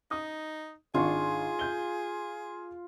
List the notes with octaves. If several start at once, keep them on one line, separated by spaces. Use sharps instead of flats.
D#4 D#6
G#1 D4 F4 G#4 C#6
G6 G7